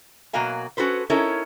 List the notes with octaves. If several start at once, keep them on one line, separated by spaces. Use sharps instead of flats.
B2 F#3 A#3 F#4 F5 G#5
C#4 F#4 A4 B4 C5
C#4 D#4 E4 A4 A#4 C#5